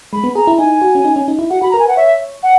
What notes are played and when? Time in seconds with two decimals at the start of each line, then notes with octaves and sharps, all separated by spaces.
0.13 G#3 B5
0.24 B3
0.35 G#4 A#5
0.47 E4
0.58 D#4 G#5
0.82 F#4
0.95 C#4
1.05 D#4
1.16 C#4
1.28 D#4
1.39 E4
1.50 F#4 F#5
1.62 F#4 B5
1.71 A#4 A#5
1.79 G#5
1.85 B4 F#5
1.97 C#5 E5
2.43 F#5